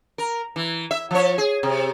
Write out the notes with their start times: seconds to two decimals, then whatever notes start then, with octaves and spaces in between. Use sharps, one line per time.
0.18 A#4
0.56 E3
0.91 E5
1.11 F3 C#5
1.38 G#4
1.63 C3